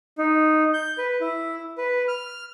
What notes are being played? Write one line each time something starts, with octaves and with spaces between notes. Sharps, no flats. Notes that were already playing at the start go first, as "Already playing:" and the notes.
D#4
G6
B4
E4
B4
F6